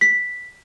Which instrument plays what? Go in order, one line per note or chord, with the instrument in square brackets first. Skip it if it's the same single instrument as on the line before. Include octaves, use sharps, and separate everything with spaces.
[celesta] B6